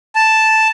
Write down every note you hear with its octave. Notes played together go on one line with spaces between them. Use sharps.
A5